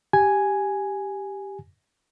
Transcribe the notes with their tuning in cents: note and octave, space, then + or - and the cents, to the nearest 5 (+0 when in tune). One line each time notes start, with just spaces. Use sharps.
G4 +0 G#5 +0